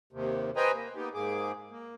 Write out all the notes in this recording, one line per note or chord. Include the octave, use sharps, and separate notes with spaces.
D#2 C3
B4 C5 D#5 G5 G#5 A#5
A#3
A#3 B3 D#4 G4
G#2 A#3 G#4 D6
A#3